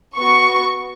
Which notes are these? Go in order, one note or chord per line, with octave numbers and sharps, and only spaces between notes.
B3 F#4 C#6